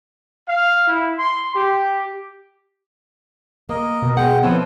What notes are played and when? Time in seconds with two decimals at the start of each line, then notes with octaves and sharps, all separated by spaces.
0.48 F5
0.86 E4
1.19 C6
1.53 G4
3.69 A#3 A#4 D#5
4.02 B2
4.17 G#3 F#5 G5
4.43 F3 B3 C4 E4 A4 C#5